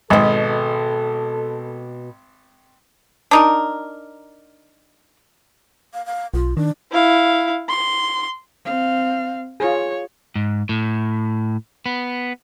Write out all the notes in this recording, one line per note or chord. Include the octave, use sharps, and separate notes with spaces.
G#1 B2 G#3 A4
D4 D#4 A#4
F5
F5
B1 F4
D#3 D4
E4 F5
C6
C4 F5
F4 G#4 C#5
G#2
A2
B3